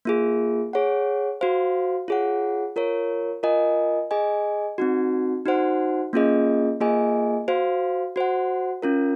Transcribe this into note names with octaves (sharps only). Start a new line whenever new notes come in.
A#3 F4 G#4
G#4 C#5 F#5
F#4 C5 F5
F4 G#4 C#5 F#5
F4 A#4 C#5
F4 A#4 D#5 G#5
G#4 D#5 G#5
C4 D#4 F#4
D#4 F#4 C5 F#5
A#3 C#4 F4 G#4 D#5
A#3 F4 G#4 D#5 G#5
F#4 C5 F5
F#4 C5 F#5
C#4 F4 A#4